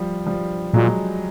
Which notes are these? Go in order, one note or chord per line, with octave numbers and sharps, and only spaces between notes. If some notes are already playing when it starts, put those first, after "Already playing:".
Already playing: F3 G3
F3 G3
A#2 F#3 G#3